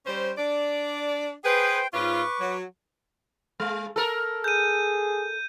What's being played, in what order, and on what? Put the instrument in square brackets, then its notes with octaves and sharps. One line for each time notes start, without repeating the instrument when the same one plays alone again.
[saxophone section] G3 C#4 C5
D4 D5
[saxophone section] G#4 B4 [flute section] C5 G5
[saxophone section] G#2 C#4 F4 [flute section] B4 C#6 D6
[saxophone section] F#3
[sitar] G#3
A4 A#4
[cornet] G#4 [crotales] G6 D#7